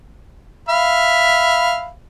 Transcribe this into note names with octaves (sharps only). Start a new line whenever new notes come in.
E5 F5 B5